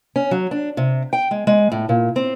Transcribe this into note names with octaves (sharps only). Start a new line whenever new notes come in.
C#4
F#3
D4
C3
G5
G#3
G#3
A2
A#2
C4